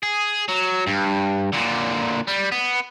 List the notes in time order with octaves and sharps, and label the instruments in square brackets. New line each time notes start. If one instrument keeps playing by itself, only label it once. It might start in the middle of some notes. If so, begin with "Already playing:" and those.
[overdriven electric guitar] G#4
F#3
G2
A#2 D3
G3
B3